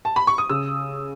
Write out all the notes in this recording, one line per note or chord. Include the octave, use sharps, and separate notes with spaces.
A5
B5
C#6
D#6
C#3 E6